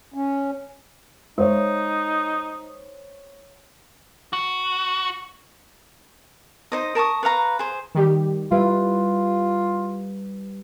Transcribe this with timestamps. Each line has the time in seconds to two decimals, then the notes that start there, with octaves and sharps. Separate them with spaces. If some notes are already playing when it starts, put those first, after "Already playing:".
0.14 C#4
1.38 G#3 D#4 C5 C#5
4.33 F#4
6.72 D#4 C5 D#5
6.95 A#4 A5 C#6 D#6
7.23 B4 C#5 F5 A#5
7.59 G#4 C5
7.95 D#3 G3 G4
8.52 G3 E4 F4 B4